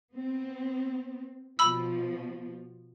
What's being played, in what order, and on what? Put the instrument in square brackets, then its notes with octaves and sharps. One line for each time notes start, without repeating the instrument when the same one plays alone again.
[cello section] B3 C4
[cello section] B2 F3 [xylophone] B5 E6